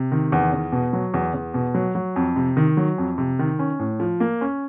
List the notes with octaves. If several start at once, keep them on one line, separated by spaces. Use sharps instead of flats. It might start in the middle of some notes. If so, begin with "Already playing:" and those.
Already playing: C3
D#3
E2
E2
B2
F#3
E2
E2
B2
F#3
F#3
F2
C3
D#3
F#3
F2
C3
D#3
C#4
A2
F3
A#3
C#4